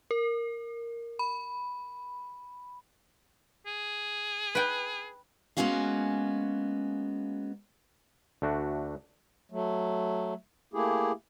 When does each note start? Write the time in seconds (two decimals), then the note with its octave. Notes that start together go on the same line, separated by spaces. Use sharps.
0.11 A#4
1.19 B5
3.66 G#4
4.55 B4 G5 B5
5.57 G#3 A#3 B3 C#4 F#4 F5
8.42 D2 A3 D4 F#4
9.52 F#3 A3
10.74 A3 A#3 E4 G4 G#4